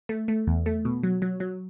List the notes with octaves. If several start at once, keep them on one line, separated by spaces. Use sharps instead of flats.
A3
A3
E2
A3
B2
F#3
F#3
F#3